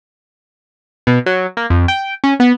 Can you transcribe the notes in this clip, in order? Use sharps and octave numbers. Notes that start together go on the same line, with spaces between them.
B2
F#3
A#3
F2
G5
C#4
B3